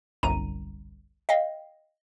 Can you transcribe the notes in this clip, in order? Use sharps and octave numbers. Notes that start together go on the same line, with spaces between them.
G1 C2 F#2 A#5 D#7
D#5 F5 G5